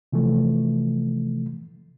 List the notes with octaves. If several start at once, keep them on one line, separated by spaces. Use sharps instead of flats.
C3 E3 F3 A3